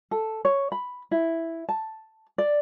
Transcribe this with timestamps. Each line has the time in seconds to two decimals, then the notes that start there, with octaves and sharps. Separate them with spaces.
0.11 A4
0.45 C#5
0.72 B5
1.11 E4
1.69 A5
2.38 D5